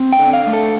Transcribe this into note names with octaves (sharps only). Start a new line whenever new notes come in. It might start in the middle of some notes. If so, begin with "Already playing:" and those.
Already playing: C4
G5
D3
F5
A3
A4